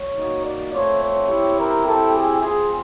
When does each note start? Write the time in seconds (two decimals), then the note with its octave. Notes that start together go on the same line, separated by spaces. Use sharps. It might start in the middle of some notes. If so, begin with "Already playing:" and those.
Already playing: C#5
0.15 A#3 D#4 F#4
0.43 D5
0.71 A3 C4 F4 C#5
1.00 C#5
1.27 C4 E4 G4
1.56 A#4
1.84 C4 E4 G4 A4
2.12 G#4
2.40 C4 F4 G#4